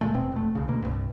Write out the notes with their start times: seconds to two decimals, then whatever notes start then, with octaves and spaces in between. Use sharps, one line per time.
0.01 D2 A#2 G#3 A3
0.14 E1 B2 C4
0.32 F1 A3
0.55 C2 C#3
0.68 D2 B2 A#3
0.82 C2 G2